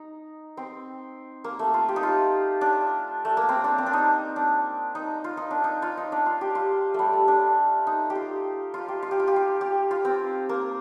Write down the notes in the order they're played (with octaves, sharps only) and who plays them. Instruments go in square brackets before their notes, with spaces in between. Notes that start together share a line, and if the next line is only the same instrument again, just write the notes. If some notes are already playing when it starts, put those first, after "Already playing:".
Already playing: [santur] D#4
C4
A#3
A3
F4
G4
D#4
F4
D4
A3
A#3
C4
D4
C4
D4
D#4
D4
D#4
F4
D#4
D4
D#4
F4
D#4
D4
F4
G4
F4
G3 A3
A3
D4
D#4
G4
F4
F4
G4
F4
G4
F4
G4
F4
G4
F4
C4
A#3